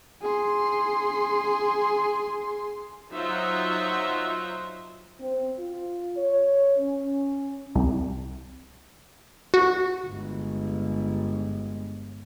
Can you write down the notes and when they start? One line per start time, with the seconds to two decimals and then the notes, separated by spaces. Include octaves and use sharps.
0.22 G#4 C6
3.11 F#3 D#4 F4 C5 E5 F#5
5.21 C4
5.59 F4
6.17 C#5
6.78 C#4
7.75 C2
9.54 F#4
10.07 G1 G#3